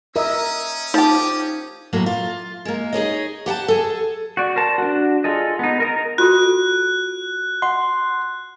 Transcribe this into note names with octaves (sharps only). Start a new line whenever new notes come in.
C#4 A#4 D#5 E5 D#6
F3 D#4 G4
A2 F#3 A#3 F#4
F4
G#3 A#3
D#4 G#4 C#5 D#5
G4 F#5 G5 A5
G#4 A4
F#4 D5
A#4 C5 A5
D4 F#4
F4 G#4 A4 D#5
B3 D#4
A#4 D#5 A#5
F4 F#4 A4 F#6
F#5 C6